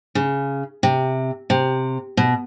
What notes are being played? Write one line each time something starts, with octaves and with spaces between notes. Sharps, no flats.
C#3
C3
C3
B2